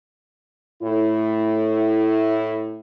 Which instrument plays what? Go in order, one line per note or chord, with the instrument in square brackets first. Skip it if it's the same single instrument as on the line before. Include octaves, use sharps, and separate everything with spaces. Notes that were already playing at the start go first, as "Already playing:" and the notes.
[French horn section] A2 E4